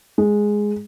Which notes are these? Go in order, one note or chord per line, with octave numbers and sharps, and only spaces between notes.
G#3